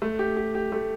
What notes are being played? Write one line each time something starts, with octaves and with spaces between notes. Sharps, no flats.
A3
G4
G4
G4
A3